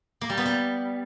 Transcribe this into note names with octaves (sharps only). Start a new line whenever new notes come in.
A#3
G3
B3
G3